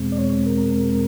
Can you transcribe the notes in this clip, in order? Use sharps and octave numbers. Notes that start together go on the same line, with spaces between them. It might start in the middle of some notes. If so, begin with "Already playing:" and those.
Already playing: E2 B2 G#3 C4
D5
C#5
A#4